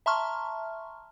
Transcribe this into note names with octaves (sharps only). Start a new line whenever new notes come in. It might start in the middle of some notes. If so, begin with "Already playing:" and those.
E5 A5 A#5 C6 C#6 F6